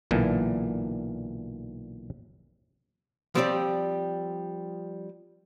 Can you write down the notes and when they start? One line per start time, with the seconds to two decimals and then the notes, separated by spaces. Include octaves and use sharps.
0.11 B1 A#2 D3 E3
3.35 F3 G3 C4 G4 D5